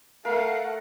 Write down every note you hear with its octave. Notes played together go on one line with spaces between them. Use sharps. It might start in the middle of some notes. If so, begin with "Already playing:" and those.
A3 A#4 F5 F#5